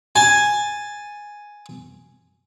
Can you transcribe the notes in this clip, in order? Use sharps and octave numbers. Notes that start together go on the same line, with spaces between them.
G#5 A5